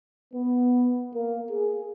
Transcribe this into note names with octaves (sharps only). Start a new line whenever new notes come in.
B3
A#3
G#4